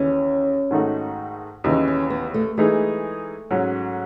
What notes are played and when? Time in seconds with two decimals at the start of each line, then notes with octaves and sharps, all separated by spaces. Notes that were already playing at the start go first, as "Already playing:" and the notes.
Already playing: D#2 C#3 E3 C#4
0.71 G#2 D#3 A3 D#4 F#4
1.64 D#2 C#3 E3 D#4
1.88 C#4
2.10 B3
2.34 A3
2.57 E3 G#3 A3 D#4 G#4
3.51 G#2 F#3 C#4